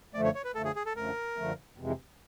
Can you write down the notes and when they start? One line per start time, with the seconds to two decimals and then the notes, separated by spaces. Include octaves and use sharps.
0.14 F#2 D3 F3 A3 D5
0.24 C#5
0.35 C#5
0.44 B4
0.55 F#2 D3 F3 A3 A4
0.65 G#4
0.76 G#4
0.86 A4
0.96 F#2 D3 F3 A3 A#4
1.36 F#2 D3 F3 A3
1.78 F2 C3 E3 G#3